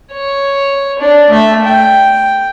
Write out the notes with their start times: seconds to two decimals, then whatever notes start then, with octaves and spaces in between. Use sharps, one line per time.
0.12 C#5
0.99 D4
1.28 A3 E5
1.65 G5